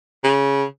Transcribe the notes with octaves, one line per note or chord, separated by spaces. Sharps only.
C#3